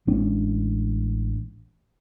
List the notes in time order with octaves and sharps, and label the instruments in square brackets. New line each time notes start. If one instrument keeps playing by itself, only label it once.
[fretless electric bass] A1 G#3 C#4 D4